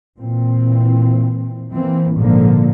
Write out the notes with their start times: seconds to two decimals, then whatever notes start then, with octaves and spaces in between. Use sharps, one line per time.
0.18 A#2 E3 C4
1.73 E3 A#3 C4
2.16 G#1 A#2 D3 F3 A#3